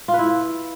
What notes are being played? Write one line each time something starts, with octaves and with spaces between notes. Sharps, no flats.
F4
B4
E4